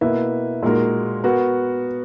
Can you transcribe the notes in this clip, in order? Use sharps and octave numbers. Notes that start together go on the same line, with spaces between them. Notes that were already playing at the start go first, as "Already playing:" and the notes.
B2 A#3 E4 B4 E5
A#2 G#3 D#4 F#4 A#4
B3 F#4 A#4